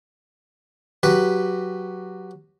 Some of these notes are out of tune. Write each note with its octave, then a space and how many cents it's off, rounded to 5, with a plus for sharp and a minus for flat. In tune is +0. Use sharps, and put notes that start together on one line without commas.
F#3 +0 G4 +0 B4 +0